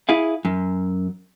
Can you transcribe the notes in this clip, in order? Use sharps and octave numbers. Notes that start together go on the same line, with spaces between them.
E4 G#4 F5
F#2